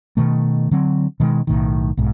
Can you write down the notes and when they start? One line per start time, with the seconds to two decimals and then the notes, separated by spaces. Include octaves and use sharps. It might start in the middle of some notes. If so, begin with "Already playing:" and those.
0.17 B2 D#3 A3
0.71 D3 F#3 C4
1.20 B2 D#3 G#3
1.47 B1 A2 D#3
1.97 B1 G#2